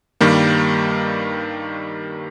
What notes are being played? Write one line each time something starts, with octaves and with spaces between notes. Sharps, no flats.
G2 D#3 G3 A#3